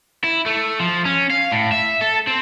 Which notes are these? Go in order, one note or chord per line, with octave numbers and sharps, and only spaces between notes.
E4
A3
F3
C#4
F5
A2
E5
A4
C4